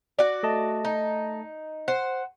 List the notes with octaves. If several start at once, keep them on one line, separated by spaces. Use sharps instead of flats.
F#4 D5
A3 D#5 A5
D#4
C5 F#5